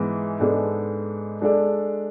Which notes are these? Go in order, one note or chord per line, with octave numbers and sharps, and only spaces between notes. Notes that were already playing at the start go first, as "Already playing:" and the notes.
Already playing: G#2 E3 G#3 B3
G#2 G#3 B3 D4 A4
G#3 D4 A4 D5